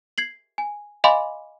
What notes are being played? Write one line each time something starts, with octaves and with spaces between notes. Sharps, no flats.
G#6 C7 F#7
G#5
D#5 F5 G#5 B5 C6 D6